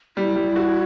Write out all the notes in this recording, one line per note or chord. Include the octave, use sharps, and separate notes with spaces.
G3 E4
G3
F#4